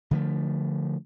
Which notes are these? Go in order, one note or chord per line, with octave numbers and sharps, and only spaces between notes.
D3 F3 A3